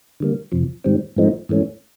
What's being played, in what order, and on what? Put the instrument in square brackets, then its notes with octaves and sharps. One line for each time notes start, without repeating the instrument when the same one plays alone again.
[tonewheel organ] D3 G3 A#3
F2 C3 F3
G#2 D#3 G3 C4
G#2 F3 A3 C4 D#4
G#2 E3 A3 C#4